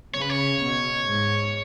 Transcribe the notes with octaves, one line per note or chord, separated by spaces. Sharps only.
C#3 C#5
B4
C#5
B2
G#2